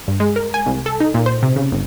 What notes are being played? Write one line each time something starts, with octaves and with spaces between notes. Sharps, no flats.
G2
G#3
A#4
G#5
C2
A4
D#4
A#2
C5
C3
C#3
G1